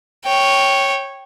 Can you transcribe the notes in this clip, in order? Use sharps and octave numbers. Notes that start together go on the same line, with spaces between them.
C#5 G5